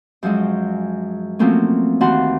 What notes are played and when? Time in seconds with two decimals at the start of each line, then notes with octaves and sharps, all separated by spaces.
0.23 F#2 F3 F#3 G#3
1.39 F3 F#3 A3 A#3 C4 C#4
2.01 D#2 E3 F#4 F#5 A5 C6